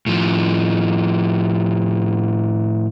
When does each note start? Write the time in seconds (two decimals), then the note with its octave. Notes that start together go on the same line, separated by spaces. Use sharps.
0.06 A2 F3